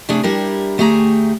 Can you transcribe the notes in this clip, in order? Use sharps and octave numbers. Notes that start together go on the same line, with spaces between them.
C3 A3 D4 G#4
G3 D4 E4 G4 A#4
D2 A3 G4 G#4 A#5